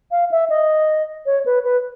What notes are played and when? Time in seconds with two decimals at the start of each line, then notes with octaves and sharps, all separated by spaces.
0.11 F5
0.31 E5
0.50 D#5
1.26 C#5
1.46 B4
1.64 B4